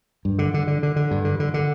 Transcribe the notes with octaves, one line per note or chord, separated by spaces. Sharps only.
G2
D3
D3
D3
D3
D3
G2
D3
D3
D3